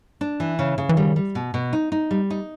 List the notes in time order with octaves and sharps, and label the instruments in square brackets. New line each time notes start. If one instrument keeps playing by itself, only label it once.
[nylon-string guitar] D4
E3
C#3
C#3
[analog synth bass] E3
[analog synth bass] D#3 [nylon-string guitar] G3
[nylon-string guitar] G3
B2
B2
D#4
D#4
G3
D#4